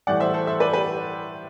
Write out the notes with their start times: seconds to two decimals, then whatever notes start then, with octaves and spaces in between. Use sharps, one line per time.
0.07 A2 E3 G3 D5 F#5
0.20 C5 E5
0.34 A4 C5
0.47 C5 E5
0.60 B4 D5
0.73 G4 B4